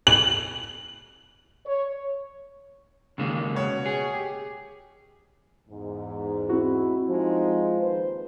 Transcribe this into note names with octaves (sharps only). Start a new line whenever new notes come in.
F#7
C#5
D#2 C#3 G#3 A#3
B2 C#5 F#5
G#4
G4
E2 G#2
C4 E4 F#4
F3 G#3 D#4
D#2 B4 C5